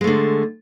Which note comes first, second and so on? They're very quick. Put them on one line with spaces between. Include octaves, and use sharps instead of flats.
G#3 A3 D3